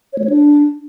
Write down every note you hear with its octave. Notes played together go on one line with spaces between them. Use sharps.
C#5
A3
C#5
D4